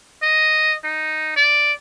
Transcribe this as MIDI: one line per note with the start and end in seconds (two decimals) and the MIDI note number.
0.23 0.75 75
0.84 1.34 63
1.36 1.73 74